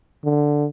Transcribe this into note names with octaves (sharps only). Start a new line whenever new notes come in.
D3